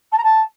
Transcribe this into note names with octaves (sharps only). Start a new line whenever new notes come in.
A5
A#5
A5